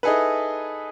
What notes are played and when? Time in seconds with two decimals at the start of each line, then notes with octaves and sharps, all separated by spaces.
0.03 D#4 E4 G#4 A4 B4